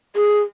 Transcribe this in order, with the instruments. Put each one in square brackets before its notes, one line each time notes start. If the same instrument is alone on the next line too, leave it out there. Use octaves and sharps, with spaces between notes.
[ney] G#4